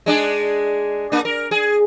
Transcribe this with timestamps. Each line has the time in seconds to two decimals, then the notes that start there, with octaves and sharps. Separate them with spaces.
0.06 G#3 D4 G#4
1.12 A#3 D4
1.25 A#4
1.51 G#4